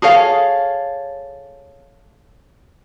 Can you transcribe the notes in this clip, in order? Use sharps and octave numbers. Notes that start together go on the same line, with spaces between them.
G#4 A4 C#5 F5